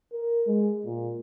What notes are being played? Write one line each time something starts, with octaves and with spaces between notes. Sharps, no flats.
A#4
G#3
A#2